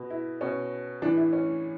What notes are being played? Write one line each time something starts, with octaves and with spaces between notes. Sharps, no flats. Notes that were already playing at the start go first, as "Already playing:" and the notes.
Already playing: B2
E4
B2 C#4
A2 E3 D4
E4
C#4